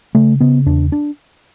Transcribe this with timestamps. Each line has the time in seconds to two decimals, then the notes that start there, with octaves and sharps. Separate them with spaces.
0.15 C#3 A3
0.40 C#3 B3
0.66 E2 D4
0.92 D4